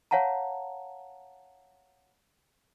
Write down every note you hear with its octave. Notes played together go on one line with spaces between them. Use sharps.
C#5 F5 F#5 A5 A#5